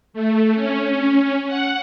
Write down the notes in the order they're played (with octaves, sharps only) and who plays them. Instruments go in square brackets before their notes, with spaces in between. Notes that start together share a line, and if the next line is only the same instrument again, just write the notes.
[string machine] A3
C#4
F#5